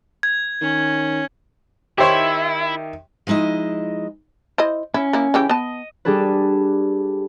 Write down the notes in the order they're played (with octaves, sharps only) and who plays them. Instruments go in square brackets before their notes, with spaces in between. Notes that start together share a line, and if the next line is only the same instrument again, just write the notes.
[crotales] G#6
[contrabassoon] D#3 [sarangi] C#4
[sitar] D#3 E5 [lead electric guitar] E4 [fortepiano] G4 C5 C#5
[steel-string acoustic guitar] F3 G#3 D#4 E4 D#5
[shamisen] E4 C5 D#5
[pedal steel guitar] C#4 [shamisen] E4
[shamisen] A#3 E4
C#3 E3 G4
[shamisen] B3 A5 [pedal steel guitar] D#5
[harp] G3 D4 G#4 A4 B4